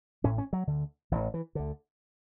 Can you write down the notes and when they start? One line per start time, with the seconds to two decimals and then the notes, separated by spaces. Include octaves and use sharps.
0.24 A1 A2 C#4
0.38 C#4
0.53 F#3
0.67 D2 D3
1.11 A1 E3
1.16 A2
1.34 E3
1.55 D2 D3